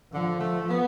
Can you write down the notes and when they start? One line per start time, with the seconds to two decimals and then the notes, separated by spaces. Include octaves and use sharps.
0.13 D3 F3
0.40 A3
0.69 B3